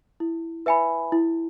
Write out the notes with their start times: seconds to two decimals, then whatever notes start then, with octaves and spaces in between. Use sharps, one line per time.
0.20 E4
0.66 B4 E5 G#5 B5
1.12 E4